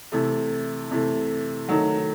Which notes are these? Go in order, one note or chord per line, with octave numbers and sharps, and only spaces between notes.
C3 E3 A3
C3 E3 A3
D#3 F#3 A3